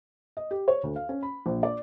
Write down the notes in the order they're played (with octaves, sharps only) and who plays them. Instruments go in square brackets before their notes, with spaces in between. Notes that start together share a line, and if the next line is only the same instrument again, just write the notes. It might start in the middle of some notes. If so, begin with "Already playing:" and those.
[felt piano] D#5
G4
C#5
D2
F5
C#4
B5
A#1
D5